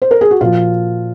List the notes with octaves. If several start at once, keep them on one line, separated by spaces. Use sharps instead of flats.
C5
A#4
G#4
F#4
A#2 F3 F4